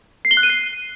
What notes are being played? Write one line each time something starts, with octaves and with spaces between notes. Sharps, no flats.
C7
G7
F#6
D#7
C7